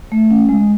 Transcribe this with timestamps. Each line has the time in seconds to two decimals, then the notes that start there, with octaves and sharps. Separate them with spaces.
0.12 A3
0.31 C#4
0.49 G#3